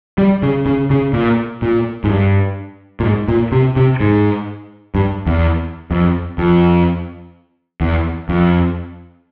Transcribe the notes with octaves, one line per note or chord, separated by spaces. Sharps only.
G3
C#3
C#3
C#3
A#2
A#2
G#2
G2
A#2
G#2
A#2
C3
C3
G#2
G2
E2
F2
F2
E2
F2